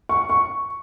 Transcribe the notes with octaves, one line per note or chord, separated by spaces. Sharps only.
C#6
C#6